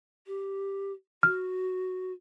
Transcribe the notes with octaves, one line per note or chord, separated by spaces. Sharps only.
G4
F#4 F6